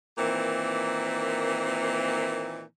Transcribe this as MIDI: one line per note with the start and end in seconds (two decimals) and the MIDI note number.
0.18 2.62 46
0.18 2.62 51
0.18 2.62 52
0.18 2.62 58
0.18 2.62 60